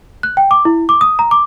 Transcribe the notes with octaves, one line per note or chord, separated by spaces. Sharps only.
F#6
G5
D6
E4
D6
D#6
A#5
D6